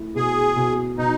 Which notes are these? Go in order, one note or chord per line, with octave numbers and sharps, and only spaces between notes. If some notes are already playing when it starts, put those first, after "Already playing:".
Already playing: A3 E4
B2 G#4
B2
B2 D#4